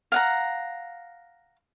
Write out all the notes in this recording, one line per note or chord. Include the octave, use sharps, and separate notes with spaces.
F5 F#5 A#5